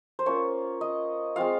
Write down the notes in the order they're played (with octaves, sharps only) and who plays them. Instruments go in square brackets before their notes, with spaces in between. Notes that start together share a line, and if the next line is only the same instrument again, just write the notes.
[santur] C5
A#3 C#4 F4 C#5
D#5
G#3 C4 F4 F5